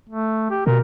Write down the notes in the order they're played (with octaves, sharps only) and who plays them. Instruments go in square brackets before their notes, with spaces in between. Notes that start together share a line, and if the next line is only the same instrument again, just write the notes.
[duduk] A3
G4
[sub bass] B2 [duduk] A#4